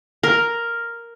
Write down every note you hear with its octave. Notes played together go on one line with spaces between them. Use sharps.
A#4